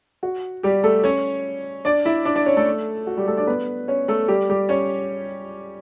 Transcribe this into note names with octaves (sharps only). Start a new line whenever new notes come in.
F#4
G3 G4
A3 A4
C#4 C#5
D4 D5
E4 E5
D4 D5
D4 D5
C#4 C#5
A3 A4
F#4
G3 G4
A3 A4
D4 D5
B3 B4
C#4 C#5
A3 A4
G3 G4
G3 G4
C#4 C#5